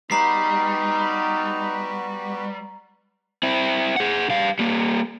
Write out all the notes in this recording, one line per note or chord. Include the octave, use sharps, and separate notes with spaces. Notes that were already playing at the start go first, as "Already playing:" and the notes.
G3 B3 D#4 F#4 B4 A#5 C7
C4 E4
G#4 F#5
G3 F5
G3 A#3